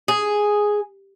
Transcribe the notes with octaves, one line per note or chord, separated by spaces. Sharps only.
G#4